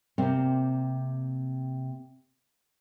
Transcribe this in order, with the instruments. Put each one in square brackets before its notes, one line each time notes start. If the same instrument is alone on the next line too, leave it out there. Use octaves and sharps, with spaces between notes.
[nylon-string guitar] C3 A#3 C4